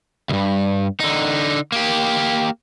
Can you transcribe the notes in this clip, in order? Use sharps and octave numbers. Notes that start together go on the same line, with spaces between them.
C#2 G2
D3 D#4
A#3 G4